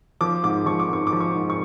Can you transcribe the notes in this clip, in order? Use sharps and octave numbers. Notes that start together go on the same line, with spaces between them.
F3 D6
G#2 D6
F3 C#6
D6
G#2 C#6
D6
F3
C#6
G#2
C#6